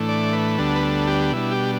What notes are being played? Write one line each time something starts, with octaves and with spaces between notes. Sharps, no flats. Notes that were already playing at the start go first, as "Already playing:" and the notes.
Already playing: A2 E3 A3 D4
D5
B4
D2 D3 G3 B3 D4 A4
B4
A4
G4
B2 G3 D4 E4
G4